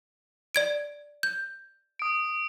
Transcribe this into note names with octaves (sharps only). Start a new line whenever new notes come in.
D5 G#6 D7
G6
D#6 D7